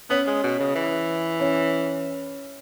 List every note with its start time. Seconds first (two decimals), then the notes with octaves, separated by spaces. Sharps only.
0.10 B3 C#4
0.27 G#3
0.43 B2
0.60 C#3
0.75 E3
1.40 C#4